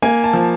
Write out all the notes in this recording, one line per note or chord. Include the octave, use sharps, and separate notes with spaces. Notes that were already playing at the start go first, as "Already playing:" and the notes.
A#3 G#5
A5
F3